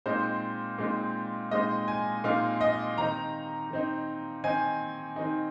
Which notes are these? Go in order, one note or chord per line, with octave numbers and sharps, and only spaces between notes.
A#2 G#3 C4 D#4 C5
A#2 G#3 C4 D#4
A#2 G#3 C4 D#4 D#5
G#5
A#2 G#3 C4 D#4 F5
D#5
D#3 C4 D#4 A#5
D#3 C4 D#4
D#3 C4 D#4 G#5
D#3 C4 D#4